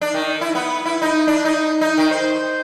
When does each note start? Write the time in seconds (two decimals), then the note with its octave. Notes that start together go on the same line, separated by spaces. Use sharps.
0.01 D4
0.14 D#3
0.41 E4
0.55 B3
0.85 E4
1.02 D#4
1.27 D4
1.45 D#4
1.81 D#4
1.98 D#3
2.11 C5